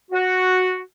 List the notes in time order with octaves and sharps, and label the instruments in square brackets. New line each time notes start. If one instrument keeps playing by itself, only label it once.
[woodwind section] F#4